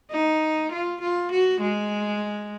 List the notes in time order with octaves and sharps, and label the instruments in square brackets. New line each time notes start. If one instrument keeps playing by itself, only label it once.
[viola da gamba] D#4
F4
F4
F#4
G#3